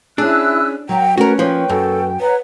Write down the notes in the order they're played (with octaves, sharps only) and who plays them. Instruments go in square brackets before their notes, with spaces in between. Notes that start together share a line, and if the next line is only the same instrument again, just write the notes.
[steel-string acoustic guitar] C#4 G#4 [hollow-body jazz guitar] D4 [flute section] E4 E6 F#6
[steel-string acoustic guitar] F#3 [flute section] A#4 F#5 A#5 [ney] G5
[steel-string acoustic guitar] A3 [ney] C#4 [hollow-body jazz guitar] F#4 A#4 [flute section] B4
[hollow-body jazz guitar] F3 [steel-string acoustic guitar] A#3 B4 C#5 [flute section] G5
[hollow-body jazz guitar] F#2 [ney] A4
[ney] B4 [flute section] C#5 F#5 A#5